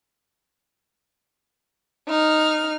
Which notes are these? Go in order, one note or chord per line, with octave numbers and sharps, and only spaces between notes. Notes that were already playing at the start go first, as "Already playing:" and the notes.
D#4 F6